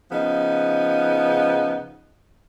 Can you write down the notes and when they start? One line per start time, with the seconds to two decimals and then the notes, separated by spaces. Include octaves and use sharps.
0.11 C#3 F3 B3 D#4